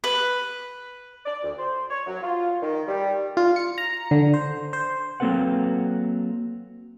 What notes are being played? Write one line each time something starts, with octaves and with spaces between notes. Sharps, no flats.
B4
D5
D2
C5
C#5
F#3
F4
D#3
G3
F4
C#7
A#5
D3
C5
C5
F#3 A#3 C4 A4 B4 F#5